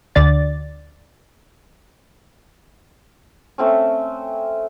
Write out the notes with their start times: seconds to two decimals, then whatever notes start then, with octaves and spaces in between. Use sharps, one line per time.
0.15 D2 D3 D5 A6
3.58 A3 C4 C#4